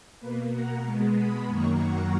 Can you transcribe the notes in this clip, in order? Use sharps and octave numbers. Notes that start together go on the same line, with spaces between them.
B2 A#3 B4
F#5 A#5
B2 G#3 B3
B5 D#6
F#2 D#3 F#3 A#3 A#5 C#6
F#5 A#5